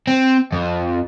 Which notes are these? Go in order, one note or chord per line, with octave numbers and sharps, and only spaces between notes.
C4
F2